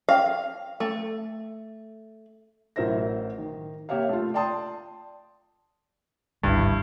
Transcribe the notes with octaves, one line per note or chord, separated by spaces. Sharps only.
F5
A3
A1 F#3 A#4 C5 E5 A#6
D#3
A#3 G4 C#5 E5 F5
A3 F4
D5 G5 A5 C6 D#6
G#1 D2 G2 E4